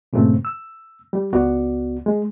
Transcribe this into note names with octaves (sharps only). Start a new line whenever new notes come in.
G2 A#2 C#3 A3 C4
E6
G3
C#2 B3 F#4 D5
G#3